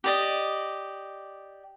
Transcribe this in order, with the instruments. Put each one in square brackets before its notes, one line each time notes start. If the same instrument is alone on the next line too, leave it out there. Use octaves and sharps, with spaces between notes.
[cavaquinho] G4 D5 D#5